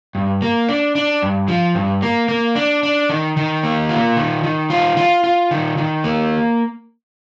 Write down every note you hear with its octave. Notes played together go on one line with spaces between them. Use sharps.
G2
A#3
D4
D4
G2
F3
G2
A#3
A#3
D4
D4
D#3
D#3
A#3
F4
D#3
D#3
F4
F4
F4
D#3
D#3
A#3